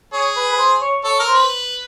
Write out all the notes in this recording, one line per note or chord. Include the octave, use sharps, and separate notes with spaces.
G#4 C#5
B4
B4
C5
C#5
A4 C#5
A#4
C5
B4